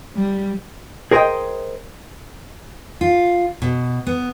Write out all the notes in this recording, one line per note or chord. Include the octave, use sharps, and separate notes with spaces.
G3
G#4 A#4 C5 C#5 D#5 G5
F4
B2
B3